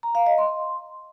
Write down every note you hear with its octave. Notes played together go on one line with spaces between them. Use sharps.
A#5
F5
D#5
C6